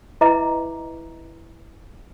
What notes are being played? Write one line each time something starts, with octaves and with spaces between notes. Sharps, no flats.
E4 B4 D#5 E5 A#5 D6